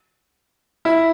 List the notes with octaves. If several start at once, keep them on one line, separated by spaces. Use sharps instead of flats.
E4